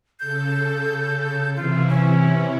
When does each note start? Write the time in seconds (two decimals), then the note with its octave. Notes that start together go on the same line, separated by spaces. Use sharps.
0.20 C#3 A4 G6
1.56 C3 E3 E4 F4
1.89 C#4